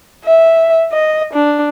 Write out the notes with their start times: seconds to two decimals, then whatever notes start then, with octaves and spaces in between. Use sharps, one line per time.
0.25 E5
0.93 D#5
1.33 D4